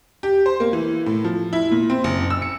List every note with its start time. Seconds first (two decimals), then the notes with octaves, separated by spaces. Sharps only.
0.23 G4
0.46 C5
0.60 A#3
0.73 E3
1.06 A2
1.24 F3
1.53 E4
1.71 A#2
1.90 C4
2.04 F#1
2.30 E6
2.42 C#7